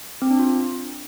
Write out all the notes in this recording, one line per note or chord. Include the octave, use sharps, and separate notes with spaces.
C4
D4
F4